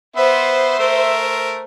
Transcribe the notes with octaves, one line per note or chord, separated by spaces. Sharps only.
B3 C5 E5
A3 A#4